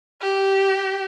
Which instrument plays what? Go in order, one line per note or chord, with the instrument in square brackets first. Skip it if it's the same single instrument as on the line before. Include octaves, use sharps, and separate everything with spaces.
[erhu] G4